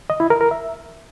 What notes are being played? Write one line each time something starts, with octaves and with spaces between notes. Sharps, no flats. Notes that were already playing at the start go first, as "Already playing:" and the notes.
D#5
E4
A#4
A#4
E5